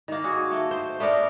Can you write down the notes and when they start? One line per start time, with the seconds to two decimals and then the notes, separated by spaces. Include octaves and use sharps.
0.08 D#3 A#3
0.24 F#4 G#4
0.51 A3
0.71 C5
1.00 A3 B3 D4 A#4